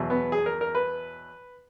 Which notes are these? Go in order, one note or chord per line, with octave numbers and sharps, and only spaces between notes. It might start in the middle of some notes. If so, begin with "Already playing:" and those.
Already playing: E2 B2 F#3
B3
G#4
A#4
A#4
B4